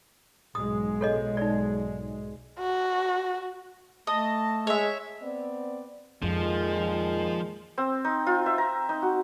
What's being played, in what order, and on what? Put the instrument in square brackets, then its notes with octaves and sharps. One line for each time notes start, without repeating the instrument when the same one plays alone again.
[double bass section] B1 G#2 G#3 [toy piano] D#6
[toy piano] A4 C#5 D#5
D#4 D5
[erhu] F#4
[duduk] A3 [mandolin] D#5 [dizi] A5
[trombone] G#3 [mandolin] C#5 E5
[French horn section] B3 C4 D5
[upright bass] F2 [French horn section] A#2 D#3 G#3 [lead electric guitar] F3
[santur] C4
D#4
F4
E5
A#5
D#4
F#4